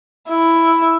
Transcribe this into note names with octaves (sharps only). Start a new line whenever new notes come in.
E4